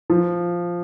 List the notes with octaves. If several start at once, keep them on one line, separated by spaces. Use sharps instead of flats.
F3